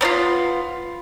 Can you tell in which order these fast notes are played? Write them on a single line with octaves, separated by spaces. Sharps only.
B3 D4 F4